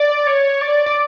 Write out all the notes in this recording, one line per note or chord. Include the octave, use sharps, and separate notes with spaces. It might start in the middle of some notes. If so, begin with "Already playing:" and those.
Already playing: D5
C#5
D5
D5